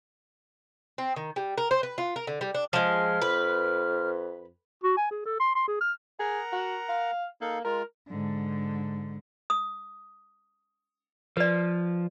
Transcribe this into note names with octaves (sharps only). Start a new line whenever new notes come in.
C4
D#3
G3
A#4
C5
B4
F4
A#4
D3
G3
D4
F3 G#3 F6
F2 B4
F#4
G#5
G#4
A4
C6
C6
G#4
F6
G#4 A#4 F#5 A#5
F#4
F5
A#3 D#4 A4 F5
G#3 F4 A#4
G#2 D3
D#6
F3 B4 D5